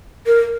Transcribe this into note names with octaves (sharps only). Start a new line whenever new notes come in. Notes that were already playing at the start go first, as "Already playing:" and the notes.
A#4